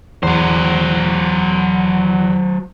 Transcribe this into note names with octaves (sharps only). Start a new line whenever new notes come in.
E2 F#3 C5